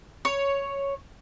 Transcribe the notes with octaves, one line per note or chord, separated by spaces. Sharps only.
C#5